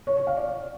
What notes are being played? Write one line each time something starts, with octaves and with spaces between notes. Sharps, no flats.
C#5
C#5
F5
D5